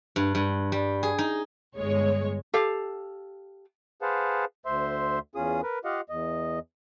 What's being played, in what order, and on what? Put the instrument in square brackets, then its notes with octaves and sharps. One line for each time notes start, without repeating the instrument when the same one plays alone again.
[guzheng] G2
G2
G3
G#4
D#4
[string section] G1 G#3 C#5
[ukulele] G4 A4 F5
[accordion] G#4 B4 C5 F5 F#5 A5
D2 C5 E5 C6
E2 C#4 F4 G#4 D#6
A#4 B4
F4 G4 D#5 F5 F#5
E2 D#5